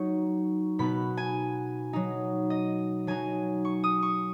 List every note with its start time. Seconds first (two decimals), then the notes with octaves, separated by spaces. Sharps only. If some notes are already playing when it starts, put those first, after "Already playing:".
Already playing: F#3 D#4 C#6
0.79 B2 B3 D#4 B5
1.17 G#5
1.93 F#3 D#4
2.50 D#5
3.07 F#3 D#4 G#5
3.65 C#6
3.84 D#6
4.02 C#6